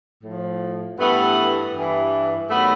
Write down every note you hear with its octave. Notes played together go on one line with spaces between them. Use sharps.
A2 F3
G2 E3 A3 B3
G2 E3
G2 D#3 F#3 A3 B3